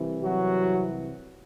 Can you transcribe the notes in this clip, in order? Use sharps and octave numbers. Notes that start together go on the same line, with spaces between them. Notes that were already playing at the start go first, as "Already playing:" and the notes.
Already playing: C2 C3 E3
F#3 F#4